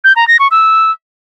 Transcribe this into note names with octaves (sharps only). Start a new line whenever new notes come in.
G6
A#5
A#6
C#6
E6